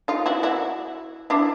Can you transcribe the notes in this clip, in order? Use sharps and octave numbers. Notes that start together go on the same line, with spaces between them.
D#4 F4
E4 F#4
E4 F#4
D4 E4